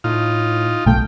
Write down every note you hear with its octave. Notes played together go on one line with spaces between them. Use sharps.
A2 D#4 F4
B1 A3 G5